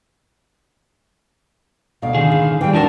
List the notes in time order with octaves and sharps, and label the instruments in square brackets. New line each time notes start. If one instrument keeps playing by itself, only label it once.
[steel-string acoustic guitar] D2 B2 [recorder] F5
[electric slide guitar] D3 D#3 G#4
[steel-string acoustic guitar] C#3
[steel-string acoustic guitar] E3 G3 [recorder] G5
[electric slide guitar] E2 D#4 A#4 [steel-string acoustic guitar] D4 F#4 [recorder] A5